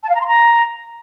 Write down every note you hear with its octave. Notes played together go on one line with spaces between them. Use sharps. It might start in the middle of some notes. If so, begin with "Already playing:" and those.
A5
F5
A#5
C6
A#5